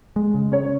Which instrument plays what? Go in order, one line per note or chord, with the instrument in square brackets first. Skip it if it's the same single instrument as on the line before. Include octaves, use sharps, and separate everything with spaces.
[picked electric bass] G#3
C#3
[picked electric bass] C#4 [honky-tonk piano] C#5